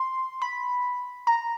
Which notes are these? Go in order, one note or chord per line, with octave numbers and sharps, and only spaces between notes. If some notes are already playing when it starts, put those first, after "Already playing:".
Already playing: C6
B5
A#5